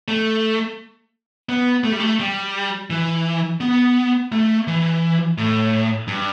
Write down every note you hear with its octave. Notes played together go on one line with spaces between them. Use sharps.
A3
B3
A3
G3
A3
G3
E3
B3
A3
E3
A2
G2